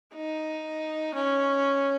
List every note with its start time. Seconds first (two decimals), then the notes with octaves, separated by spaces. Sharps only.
0.14 D#4
1.14 C#4